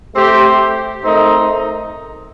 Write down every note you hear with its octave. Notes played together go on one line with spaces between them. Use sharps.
A3 C4 G4 C5
A3 C4 D#4 A#4